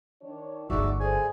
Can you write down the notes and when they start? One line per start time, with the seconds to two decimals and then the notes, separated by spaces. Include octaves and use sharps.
0.22 D#3 D4 C#5
0.70 G1 D3 A3 D#4 F#4 G#4 D5 E5
1.00 A3 G#4 C5 D5 G#5